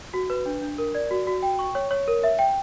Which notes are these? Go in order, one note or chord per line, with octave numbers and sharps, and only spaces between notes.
F#4
B4
D4
D4
A#4
D5
F#4
F#4
G5
C#6
C#5
C#5
A#4
E5
G5